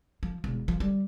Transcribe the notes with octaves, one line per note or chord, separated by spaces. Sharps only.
F3
E1
F3
G3